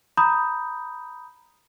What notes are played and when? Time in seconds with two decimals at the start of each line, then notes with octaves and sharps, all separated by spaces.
0.17 A#5 B5 D#6 G6